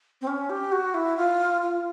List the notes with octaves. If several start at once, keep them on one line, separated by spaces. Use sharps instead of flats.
C4
C#4
G4
F#4
E4
F4
F4